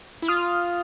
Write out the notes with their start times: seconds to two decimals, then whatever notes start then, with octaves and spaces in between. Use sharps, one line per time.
0.22 E4
0.28 F4 D#6 F6